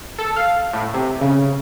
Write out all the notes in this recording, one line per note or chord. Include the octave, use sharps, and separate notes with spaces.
A4
F5
A2
C3
C#3